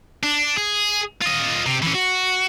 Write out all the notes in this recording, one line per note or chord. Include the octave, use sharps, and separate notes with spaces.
D4
G#4
F4 D#5
C3
E3 C#4
F#4